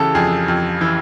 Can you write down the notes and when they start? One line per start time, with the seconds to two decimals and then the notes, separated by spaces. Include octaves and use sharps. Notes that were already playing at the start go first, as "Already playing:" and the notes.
Already playing: C#3 E3 G4 A4
0.15 F2 G#4
0.48 F2
0.81 E3